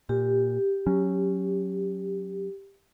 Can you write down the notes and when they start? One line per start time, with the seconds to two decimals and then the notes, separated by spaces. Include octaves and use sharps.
0.09 A#2 G4
0.87 F#3 C#4